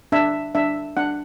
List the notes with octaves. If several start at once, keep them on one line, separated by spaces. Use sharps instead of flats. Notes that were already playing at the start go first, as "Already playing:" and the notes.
D4 E5
D4 E5
D4 F#5